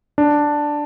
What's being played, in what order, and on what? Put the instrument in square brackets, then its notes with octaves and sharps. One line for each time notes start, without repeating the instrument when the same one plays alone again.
[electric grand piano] D4